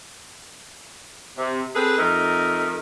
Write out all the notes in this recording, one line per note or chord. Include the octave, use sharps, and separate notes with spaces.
C3
C4 G#4 A4 B4
F2 A3 D#4 A#4